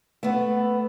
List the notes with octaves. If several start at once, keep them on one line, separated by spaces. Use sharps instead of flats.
A3 B3